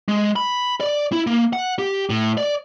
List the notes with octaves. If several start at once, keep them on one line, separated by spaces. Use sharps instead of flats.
G#3
B5
D5
E4
A#3
F#5
G4
A2
D5